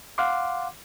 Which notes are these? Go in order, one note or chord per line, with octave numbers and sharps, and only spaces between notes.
F5 F#5 C6 D6